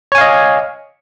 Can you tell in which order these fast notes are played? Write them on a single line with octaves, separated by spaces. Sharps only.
C#5 G#5 F5 D#5